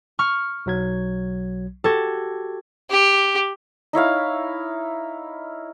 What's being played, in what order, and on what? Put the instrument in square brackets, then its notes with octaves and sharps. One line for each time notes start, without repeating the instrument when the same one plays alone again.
[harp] C#6 F6
[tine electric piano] B1 F#3 G#6
[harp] F#4 A4 [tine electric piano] G4 G#6
[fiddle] G4
[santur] D#4 E4 C#5 F5